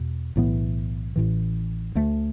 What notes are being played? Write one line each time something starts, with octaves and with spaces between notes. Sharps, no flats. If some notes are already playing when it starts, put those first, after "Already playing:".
Already playing: E2 B2
B1 A2 E3 B3
A1 A2 E3
D2 D3 A3